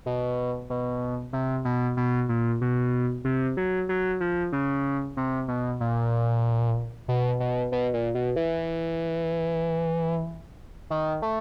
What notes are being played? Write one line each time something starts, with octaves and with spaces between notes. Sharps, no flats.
B2
B2
C3
B2
B2
A#2
B2
C3
F#3
F#3
F3
C#3
C3
B2
A#2
B2
B2
B2
A#2
B2
E3
D#3
A3